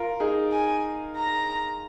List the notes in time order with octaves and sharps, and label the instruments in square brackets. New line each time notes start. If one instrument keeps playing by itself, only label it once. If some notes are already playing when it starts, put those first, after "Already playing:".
Already playing: [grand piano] F4 A#4
D#4 G#4
[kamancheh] G#5
A#5